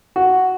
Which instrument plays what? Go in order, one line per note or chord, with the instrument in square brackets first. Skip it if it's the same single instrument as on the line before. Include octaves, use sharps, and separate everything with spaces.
[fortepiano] F#4